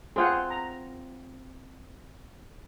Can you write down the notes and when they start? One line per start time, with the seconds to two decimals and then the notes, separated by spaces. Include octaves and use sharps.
0.16 C4 F4 G#4 C5 F#5
0.50 A#5